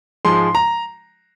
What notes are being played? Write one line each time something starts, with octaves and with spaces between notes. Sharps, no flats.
G#2 F3 G#3 C6
A#5